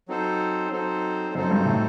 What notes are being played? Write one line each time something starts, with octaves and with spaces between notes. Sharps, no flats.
F#3 C4 D#4 A4 C5
F#3 C4 D#4 A4 C5
F#2 F#3 C4 D#4 A4 C5
G2
A2